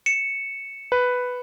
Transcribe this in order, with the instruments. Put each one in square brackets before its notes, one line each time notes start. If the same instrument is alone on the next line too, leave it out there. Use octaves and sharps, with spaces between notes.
[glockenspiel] C#7 E7
[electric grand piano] B4